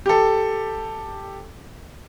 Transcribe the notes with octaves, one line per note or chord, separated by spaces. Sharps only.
G4 A4